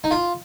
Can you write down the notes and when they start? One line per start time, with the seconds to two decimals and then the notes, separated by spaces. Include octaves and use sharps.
0.04 D#4
0.11 F4